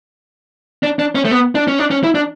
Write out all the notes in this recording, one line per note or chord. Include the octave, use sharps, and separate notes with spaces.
D4
D4
C#4
A3
B3
D4
C#4
D4
C#4
E4
D4